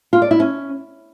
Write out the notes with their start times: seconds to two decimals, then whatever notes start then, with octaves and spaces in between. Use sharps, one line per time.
0.13 F4
0.22 D5
0.31 E4
0.40 C#4